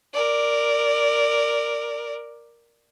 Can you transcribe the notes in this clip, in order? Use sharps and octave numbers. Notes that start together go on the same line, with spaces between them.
A#4 D5